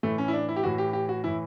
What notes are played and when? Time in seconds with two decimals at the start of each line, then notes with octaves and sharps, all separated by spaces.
0.03 A2 E3 A3
0.18 C#4
0.28 E4
0.33 D4
0.49 E4
0.56 G4
0.63 A2 E3 F#4
0.78 G4
0.93 G4
1.09 F#4
1.24 A2 E3 E4